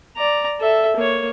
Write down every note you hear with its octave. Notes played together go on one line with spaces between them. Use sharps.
D5 A#5
A4 E5
A#3 C#5